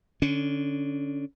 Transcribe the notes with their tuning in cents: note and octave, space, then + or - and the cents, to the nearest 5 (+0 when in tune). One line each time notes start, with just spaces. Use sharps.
D3 +0 C#4 +15